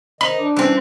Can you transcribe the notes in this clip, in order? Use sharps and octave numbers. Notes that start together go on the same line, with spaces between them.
D#3 D#4 C5 D#5 B5
D4 D6
E3 G3 C4 C#4